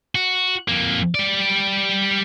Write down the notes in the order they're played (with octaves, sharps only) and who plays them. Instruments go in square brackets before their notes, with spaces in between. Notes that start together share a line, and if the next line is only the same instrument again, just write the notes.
[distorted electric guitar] F#4
F2 A#3
G3 D5